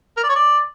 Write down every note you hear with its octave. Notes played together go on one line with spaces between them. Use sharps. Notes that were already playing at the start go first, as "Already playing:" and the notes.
A#4
D5
C#5
D5